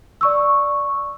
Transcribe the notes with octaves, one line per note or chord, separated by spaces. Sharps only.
D5 C#6 E6